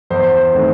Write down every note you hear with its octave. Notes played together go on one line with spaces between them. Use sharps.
E2 C5
D#3 A3 C4